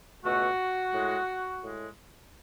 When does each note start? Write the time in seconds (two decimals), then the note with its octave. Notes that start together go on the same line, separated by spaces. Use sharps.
0.24 C#2 B2 A3 F#4
0.94 A2 G#3
1.64 A2 G#3